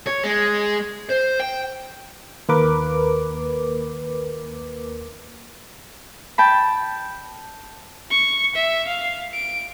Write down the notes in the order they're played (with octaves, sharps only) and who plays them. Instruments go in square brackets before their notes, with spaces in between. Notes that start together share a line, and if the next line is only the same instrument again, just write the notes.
[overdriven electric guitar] C#5
G#3
C5
G5
[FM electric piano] D#2 A#3 A#4 B4 D6
[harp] G5 A5 B5
[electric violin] C#6
E5
F5
D7